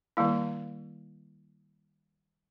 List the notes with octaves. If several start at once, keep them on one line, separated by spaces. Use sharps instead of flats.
D#3 G3 A#3 E4